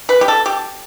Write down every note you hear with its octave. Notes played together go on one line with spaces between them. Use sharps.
B4
G4
A4
G4